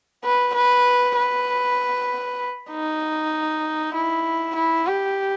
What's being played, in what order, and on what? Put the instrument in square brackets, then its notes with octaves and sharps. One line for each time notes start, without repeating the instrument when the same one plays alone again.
[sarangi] B4
B4
B4
D#4
E4
E4
G4